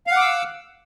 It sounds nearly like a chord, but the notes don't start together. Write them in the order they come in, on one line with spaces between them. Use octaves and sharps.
F5 F#5 D6 E6